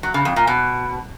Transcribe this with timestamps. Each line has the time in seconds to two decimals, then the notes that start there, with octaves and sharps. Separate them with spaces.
0.03 F#3
0.14 C#3
0.25 F2
0.36 A#2
0.47 B2